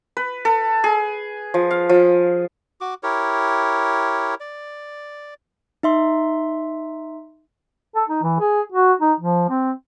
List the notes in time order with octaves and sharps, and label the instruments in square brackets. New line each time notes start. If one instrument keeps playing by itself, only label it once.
[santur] B4
A4
G#4
F3
F5
F3
[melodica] F#4 D6
E4 G4 A#4 C#5
D5
[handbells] D#4 E5 C6
[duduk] A4
D#4
E3
G#4
F#4
D#4
F3
C4